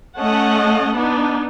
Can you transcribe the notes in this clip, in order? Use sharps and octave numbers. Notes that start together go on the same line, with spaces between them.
A3 C#4 D#5 F#5 A5
B3 D4 D#4